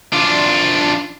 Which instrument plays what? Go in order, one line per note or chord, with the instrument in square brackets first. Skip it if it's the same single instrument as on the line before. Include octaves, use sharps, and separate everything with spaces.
[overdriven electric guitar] D4 F4